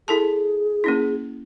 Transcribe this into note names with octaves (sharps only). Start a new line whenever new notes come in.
E4 G#4 A4 A5
A#3 C#4 E4